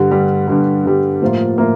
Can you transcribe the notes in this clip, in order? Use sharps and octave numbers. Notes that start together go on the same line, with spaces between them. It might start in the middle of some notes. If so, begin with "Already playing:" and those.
Already playing: G2 D3 G3
G2 D3 G3
G2 D3 G3
G2 D3 G3
A2 F3 A#3 F4
A2 F3 A#3 F4